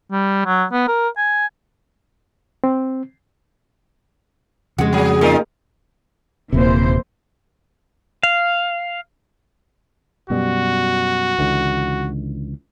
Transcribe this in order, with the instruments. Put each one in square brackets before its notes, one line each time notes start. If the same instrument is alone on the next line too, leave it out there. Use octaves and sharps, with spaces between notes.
[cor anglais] G3
F#3
B3
A#4
G#5
[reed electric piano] C4
[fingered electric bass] F2 C#3 [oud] G#3 F#4
[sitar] F#3 G#4
[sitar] C3 D#4 F4 [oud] A#3
[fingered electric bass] D#1 C3 [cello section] E3 A#3 C5
[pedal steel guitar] F5
[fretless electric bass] F#2 B2 G3 [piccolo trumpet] F#4
[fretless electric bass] C#2 D3 E3